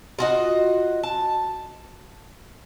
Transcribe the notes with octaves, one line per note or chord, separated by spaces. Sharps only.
F4 F#4 D#5
A5